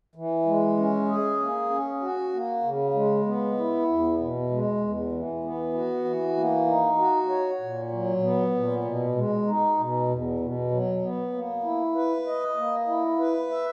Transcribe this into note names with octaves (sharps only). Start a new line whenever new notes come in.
E3
G#3
C#4
G#4
A#3
C#4
F#4
A#3
C#3
G#3
B3
E4
E2
B2
G#3
E2
E3
B3
F#4
E3
A#3
D#4
F#4
C#5
A#2
F#3
B3
A#2
B2
G#3
D#4
B2
E2
B2
F#3
B3
A#3
E4
B4
D#5
A#3
E4
B4
E5